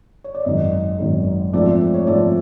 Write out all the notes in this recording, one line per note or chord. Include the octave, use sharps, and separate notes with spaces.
C#5
D5
G#1 F#2 D#3 G#3 D#5
G#1 F#2 D#3 G#3
G#2 F3 A3 C4 D5
C#5
G#2 F3 A3 C4 D5